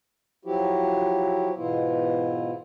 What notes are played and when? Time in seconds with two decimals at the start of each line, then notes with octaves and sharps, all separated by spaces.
0.45 F3 F#3 E4 F#4 G4
1.56 G#2 B2 E3 B3 E4 F4